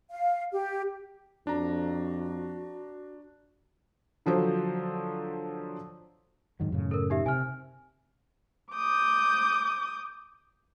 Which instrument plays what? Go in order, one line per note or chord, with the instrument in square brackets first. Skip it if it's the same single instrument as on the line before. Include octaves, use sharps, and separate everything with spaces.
[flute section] F5
G4
[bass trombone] F2 [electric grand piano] D4 A#5 [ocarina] F#4
[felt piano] D3 F3 F#3 C5
[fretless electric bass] G#2 D#3 F#3
F#2 A2 C#3
[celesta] A4 A#4
D#4 G4 E5
[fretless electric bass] C3 [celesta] G#5 F6
[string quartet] D6 D#6 G6